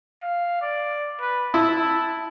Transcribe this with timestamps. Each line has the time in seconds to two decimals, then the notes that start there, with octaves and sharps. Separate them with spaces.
0.22 F5
0.61 D5
1.20 B4
1.54 E4 A5